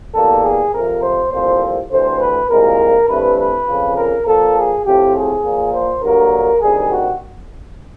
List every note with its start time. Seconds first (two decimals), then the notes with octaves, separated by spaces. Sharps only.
0.14 E2 B2 G3 A#3 A4
0.44 G#4
0.73 F2 C3 F3 A#4
1.03 C5
1.32 C2 A#2 F3 A3 C4 C5
1.90 D2 C3 E3 A3 C5
2.20 B4
2.49 C2 A#2 F3 G#3 C4 A#4
3.08 G2 E3 A3 C4 B4
3.38 B4
3.67 F2 C#3 F3
3.96 A#4
4.26 A#2 F3 A#3 A4
4.55 G#4
4.85 A2 F3 A3 C4 G4
5.15 G#4
5.43 A#2 F3 A#3
5.73 C5
6.02 G2 D3 F#3 A#3 A#4
6.61 D2 C3 D#3 G3 G#4
6.91 F#4